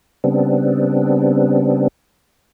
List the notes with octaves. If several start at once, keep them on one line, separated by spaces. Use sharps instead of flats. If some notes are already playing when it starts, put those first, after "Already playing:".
C#3 G3 B3 C4 D4